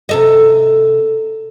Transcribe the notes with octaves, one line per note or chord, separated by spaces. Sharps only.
C3 A4 D#5